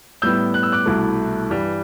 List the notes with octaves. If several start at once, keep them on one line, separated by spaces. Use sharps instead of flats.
A2 G3 B3 E4 E6 G6
F#6
E6
D6 F#6
C2 B2 A3 E4
G2 E3 G3